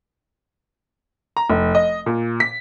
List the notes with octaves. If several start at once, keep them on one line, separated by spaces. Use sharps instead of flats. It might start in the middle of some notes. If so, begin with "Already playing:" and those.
A#5
F1
D#5
A#2
B6